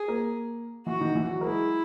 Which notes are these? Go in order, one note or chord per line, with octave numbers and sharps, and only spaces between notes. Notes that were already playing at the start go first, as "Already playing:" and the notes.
Already playing: G#4
A#3 A#4
E3 E4 F#4
D#3 D#4
E3 E4
F#3 F#4
A#4
G#3 E4 G#4